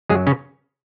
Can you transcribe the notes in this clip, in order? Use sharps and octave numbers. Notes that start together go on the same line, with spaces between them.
F#2 F#3 G#3 G#4
C#3 C#4